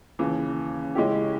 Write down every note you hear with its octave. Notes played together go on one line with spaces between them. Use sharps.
D#2 C#3 E3
C#3 G#3 C#4 E4 G4